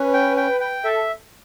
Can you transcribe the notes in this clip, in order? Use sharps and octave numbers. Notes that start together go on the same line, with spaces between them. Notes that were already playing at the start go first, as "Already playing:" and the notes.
Already playing: C#4 B4
G5
G5
G5
A4 E5